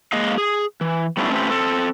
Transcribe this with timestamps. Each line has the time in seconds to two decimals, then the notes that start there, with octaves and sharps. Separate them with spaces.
0.13 G#3 A#3 G#4 D#5 F5
0.38 G#4
0.81 E3
1.17 G3 A3 B3 C#4 D4 E4
1.30 A3 C4 C#4 F4 G4 B4
1.49 C4 A4